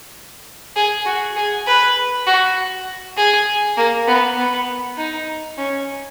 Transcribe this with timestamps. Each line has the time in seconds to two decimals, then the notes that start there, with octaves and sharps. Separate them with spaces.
0.76 G#4
1.06 F#4
1.36 G#4
1.67 B4
2.27 F#4
3.17 G#4
3.77 A#3
4.08 B3
4.37 B3
4.97 D#4
5.57 C#4